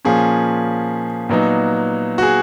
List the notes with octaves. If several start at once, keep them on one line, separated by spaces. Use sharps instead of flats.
A#2 F3 A#3 C#4 G#4
A#2 F#3 B3 D#4
F#4
G#4